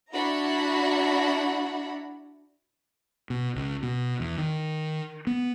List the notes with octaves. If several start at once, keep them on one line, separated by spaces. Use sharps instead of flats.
D4 E4 F#4 F#5 A#5 B5
B2
C#2
B2
E2
D#3
B3